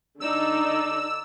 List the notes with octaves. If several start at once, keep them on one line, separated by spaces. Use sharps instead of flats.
D3 D#4 D5 E6